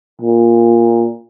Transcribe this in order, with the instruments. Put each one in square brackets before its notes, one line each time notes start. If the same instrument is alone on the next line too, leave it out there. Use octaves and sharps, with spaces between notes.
[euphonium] A#2